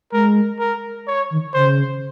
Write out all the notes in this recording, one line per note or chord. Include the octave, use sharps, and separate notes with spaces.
G#3 A#4
A#4
C#5
D#3
C#3 C5